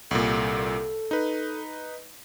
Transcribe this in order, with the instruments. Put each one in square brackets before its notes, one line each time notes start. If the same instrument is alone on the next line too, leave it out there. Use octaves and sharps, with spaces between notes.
[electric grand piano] C2 A#2 [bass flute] A4
[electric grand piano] D#4 B4